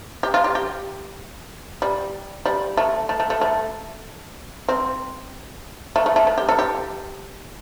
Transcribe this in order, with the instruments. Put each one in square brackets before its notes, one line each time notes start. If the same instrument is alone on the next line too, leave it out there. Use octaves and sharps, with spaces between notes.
[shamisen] G4
F4
G4
G4
G3
G3
A3
A3
A3
A3
A3
C4
A3
A3
A3
A3
G4
A4
G4